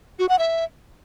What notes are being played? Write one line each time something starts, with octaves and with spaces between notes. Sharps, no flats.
F#4
F#5
E5